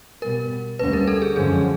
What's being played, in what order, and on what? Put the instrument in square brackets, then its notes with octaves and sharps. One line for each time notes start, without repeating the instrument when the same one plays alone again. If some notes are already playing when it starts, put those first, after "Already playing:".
[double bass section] B2 G3 B3 [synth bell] A#4
[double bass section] D2 D3 G3 A#3 C#4 [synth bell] B4
[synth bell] A#4
A4
G#4
[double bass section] F#2 D3 F3 G#3 C#4 [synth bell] G#4